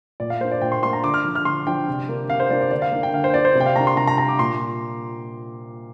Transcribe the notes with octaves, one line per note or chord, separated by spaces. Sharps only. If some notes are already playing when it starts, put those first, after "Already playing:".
A#2 D5
F5
A#3 D4 C5
D5
A#2 G5
C6
A#3 D4 C6
A#5
D3 D6
F6
F3 D4
F6
D3 C6
F3 D4 G5
C3
A#3 D4
C3 F5
C5
A#3 D4 D5
D5
D3 D5
F5
A#3 D4
G5
D3 F5
C5
A#3 D4 D5
C5
C3
G5
F5
A#3 D4 A#5
C6
C3 A#5
A#5
A#3 D4 A#5
D6
A#2 C6